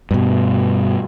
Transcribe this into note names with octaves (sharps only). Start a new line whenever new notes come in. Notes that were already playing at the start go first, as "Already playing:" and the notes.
G2 B2